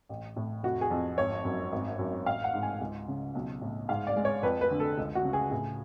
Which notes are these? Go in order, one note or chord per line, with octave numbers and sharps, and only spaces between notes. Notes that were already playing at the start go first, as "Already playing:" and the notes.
A1
A2
F1 F#4
G#4
F2
G#1 C#5
F#2
G#1
F#2
A1 F5
F#5
G#2
G#5
C#2
C#3
B1
A2
G#2 F5
D5
G#3
C#5
F2 B4
B4
D3
A4
C#2
F#4
C#3
G#4
A2 G#4